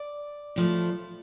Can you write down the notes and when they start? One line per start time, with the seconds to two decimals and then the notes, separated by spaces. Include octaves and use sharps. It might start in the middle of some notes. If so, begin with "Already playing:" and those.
Already playing: D5
0.56 A2 F3 A3